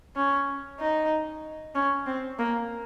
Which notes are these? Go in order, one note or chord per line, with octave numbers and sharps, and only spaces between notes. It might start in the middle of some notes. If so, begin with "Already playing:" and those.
C#4
D#4
C#4
C4
A#3